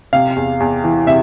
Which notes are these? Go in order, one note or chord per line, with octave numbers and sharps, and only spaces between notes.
C3 F5
E2
E2
E3
C3 E5